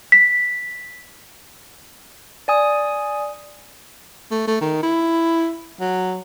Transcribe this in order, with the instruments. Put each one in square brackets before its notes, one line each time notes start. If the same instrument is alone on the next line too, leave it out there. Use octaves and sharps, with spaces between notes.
[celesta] B6
[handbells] D5 G#5 D#6
[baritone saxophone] A3
A3
D#3
E4
F#3